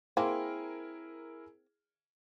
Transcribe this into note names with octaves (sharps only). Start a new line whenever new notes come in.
A#3 C4 E4 G#4 A#4